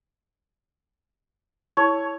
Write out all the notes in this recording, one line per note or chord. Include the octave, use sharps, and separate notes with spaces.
E4 C#5 A5